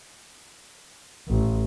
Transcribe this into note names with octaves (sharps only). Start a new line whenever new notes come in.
A1